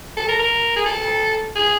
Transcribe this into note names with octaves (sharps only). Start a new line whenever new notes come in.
A4
A#4
A#4
G#4
A4
G#4